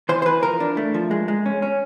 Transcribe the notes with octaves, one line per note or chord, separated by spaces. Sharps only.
E3 C5
C5
E3 B4
F3 A#4
D4
A3
F3
G#3
G#3
C#4
C#4